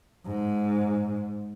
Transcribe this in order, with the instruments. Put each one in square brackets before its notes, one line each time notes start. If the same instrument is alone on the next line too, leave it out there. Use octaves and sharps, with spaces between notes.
[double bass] G#2